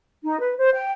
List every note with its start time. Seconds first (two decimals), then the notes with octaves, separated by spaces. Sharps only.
0.23 D#4
0.40 B4
0.58 C5
0.75 G5